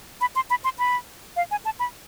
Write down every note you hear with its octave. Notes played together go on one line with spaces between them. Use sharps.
B5
C6
B5
C6
B5
F5
G#5
A5
B5